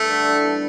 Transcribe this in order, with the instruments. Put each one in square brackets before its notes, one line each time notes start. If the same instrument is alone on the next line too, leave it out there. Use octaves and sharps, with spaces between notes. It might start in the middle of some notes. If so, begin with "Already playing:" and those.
Already playing: [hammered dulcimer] G2 [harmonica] A3
[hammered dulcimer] D3 G3
E3
G3 B3 E4